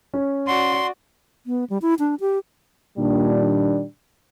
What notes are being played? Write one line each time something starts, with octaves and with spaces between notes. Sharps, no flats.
C#4
F#4 D5 C6
B3
G3
E4
D4
G4
A#2 D#3 G3 D4